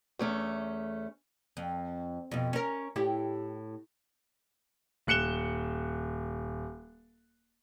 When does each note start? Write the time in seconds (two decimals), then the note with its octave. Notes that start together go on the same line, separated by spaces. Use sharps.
0.19 E2 A3 C#4
1.57 F2
2.31 F2 B2
2.53 C#4 A#4
2.96 A2 E4 G4
5.07 D#1 F#6 C#7 E7 G7